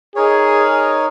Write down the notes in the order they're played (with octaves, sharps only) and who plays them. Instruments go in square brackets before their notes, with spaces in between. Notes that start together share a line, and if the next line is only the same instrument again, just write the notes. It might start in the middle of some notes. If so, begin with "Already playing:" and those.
[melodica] D#4 A#4 C#5 [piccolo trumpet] G#4